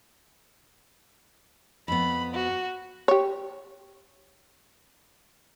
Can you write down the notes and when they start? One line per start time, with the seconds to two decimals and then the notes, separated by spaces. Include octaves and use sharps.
1.88 F2 B3 B5
2.34 F#4
3.08 G4 C#5